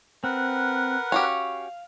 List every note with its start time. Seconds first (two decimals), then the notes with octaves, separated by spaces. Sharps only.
0.24 C4 A#4 B4 F#5
1.12 C#4 F#4 G4 F5